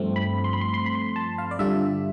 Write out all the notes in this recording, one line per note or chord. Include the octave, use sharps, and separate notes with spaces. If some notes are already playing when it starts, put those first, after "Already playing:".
Already playing: G2 F3 A3 C4
B5
C6
B5
C6
C6
B5
C6
A5
F5
D5
G2 D3 G3 D4 F4 E5